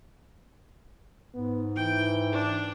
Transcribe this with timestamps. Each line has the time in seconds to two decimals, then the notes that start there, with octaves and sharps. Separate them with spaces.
1.34 G#2 B3
1.76 E3 G5
2.32 D4